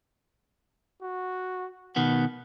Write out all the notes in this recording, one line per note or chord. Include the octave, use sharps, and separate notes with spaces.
F#4
B2 D#3 B3 F#5